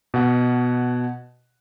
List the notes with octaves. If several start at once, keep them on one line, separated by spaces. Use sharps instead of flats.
B2 F#5